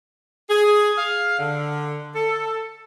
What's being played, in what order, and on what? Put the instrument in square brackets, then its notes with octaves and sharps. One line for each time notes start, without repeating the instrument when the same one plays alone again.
[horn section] G#4
F5
D3
A4